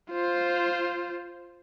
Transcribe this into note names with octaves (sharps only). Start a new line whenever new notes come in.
F4 C5